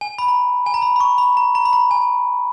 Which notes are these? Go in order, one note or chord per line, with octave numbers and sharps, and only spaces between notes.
G#5
B5
A#5
G#5
A#5
B5
B5
C#6
B5
A#5
A#5
B5
A#5
G#5